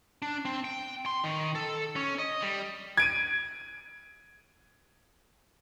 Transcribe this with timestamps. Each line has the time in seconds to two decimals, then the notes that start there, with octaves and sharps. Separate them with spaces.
0.22 D4
0.45 C4
0.64 G5
1.06 C6
1.24 D#3
1.55 A4
1.96 C#4
2.19 D#5
2.42 G3
2.97 G#6 D7 D#7